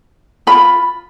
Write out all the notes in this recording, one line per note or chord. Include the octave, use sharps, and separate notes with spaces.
F4 B5